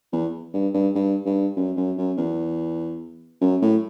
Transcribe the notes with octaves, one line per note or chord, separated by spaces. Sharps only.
E2
G2
G2
G2
G2
F#2
F#2
F#2
E2
F#2
A2